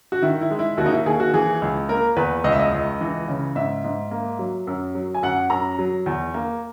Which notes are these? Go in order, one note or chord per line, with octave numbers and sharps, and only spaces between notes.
F#4
D#3 E4
E4
G#3
E4
D#2 F#4
D#4
E4
D#2 G#4
F#4
E3 G#4
C#2
A#3 A#4
E2 B4
C#2 D#5
E5
D#5
C#2
E3
C#3
G#2 E5
G#2
A#3
F#3
F#2
F#3
G#5
F#2 F#5
F#2 A#5
F#3
E2
A#3